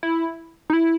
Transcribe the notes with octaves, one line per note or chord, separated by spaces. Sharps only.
E4
D#4
E4